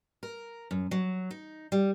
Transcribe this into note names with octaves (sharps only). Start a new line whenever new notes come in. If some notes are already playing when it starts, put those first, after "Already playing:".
A#4
F#2
F#3
D#4
G3